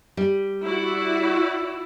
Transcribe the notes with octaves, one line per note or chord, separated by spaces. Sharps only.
G3
E4 F#4 D5